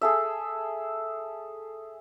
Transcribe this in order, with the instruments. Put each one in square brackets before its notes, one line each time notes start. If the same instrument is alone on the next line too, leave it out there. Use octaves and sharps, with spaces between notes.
[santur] G#4 A4 E5